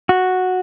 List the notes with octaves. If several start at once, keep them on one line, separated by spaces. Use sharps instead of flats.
F#4